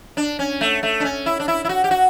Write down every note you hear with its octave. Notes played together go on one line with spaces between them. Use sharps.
D4
C#4
A3
A3
D4
C#4
E4
D4
E4
E4
F#4
G4
F#4